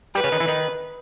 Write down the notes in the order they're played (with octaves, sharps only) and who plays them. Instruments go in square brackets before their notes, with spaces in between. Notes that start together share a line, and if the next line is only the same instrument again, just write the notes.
[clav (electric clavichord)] G3 G4 [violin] B4
[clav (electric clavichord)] C#3 C#4
D#3 D#4
E3 E4
D#3 D#4